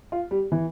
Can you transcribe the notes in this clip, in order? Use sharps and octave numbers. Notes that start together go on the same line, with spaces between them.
F4
G3
E3